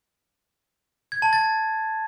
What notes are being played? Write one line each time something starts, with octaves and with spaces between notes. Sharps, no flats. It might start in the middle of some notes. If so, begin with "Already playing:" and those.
G#6
A5
A6